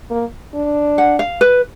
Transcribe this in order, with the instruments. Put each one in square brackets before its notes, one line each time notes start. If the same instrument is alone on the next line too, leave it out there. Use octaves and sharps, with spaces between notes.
[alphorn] A#3
D4
[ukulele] F#5
F5
B4